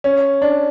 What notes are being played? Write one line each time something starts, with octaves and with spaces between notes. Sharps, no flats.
C#4
D4